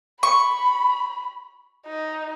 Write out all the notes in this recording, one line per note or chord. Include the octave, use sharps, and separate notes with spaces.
B5 C#6
D#4